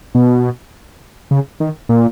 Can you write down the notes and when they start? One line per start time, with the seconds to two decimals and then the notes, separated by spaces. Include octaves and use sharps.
0.15 B2
1.31 C#3
1.60 D#3
1.89 A#2